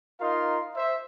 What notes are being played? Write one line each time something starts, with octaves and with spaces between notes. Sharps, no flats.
D#4 F4 A#4 D#5 F5 C6
C5 E5